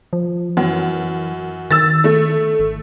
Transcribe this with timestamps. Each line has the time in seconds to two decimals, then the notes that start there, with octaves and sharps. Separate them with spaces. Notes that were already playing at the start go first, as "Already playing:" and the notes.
0.13 F3
0.57 F#2 E3
1.71 D#3 E6 A6
2.04 A3
2.60 G#1